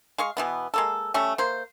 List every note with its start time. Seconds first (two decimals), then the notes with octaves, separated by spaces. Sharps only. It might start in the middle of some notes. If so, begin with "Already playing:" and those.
0.18 G#3 F5 C#6
0.37 B2 E3 B3
0.74 G#3 A#3 A4
1.14 G3 A3 C#4
1.38 A#3 C5